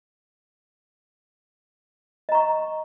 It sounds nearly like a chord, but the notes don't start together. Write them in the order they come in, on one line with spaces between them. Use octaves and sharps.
D#5 A#5 C#6